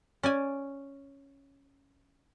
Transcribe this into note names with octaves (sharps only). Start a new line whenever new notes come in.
C#4 D5 G#5